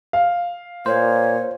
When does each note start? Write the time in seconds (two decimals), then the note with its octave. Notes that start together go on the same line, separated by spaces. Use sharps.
0.13 F5
0.86 A#2 C5 C#5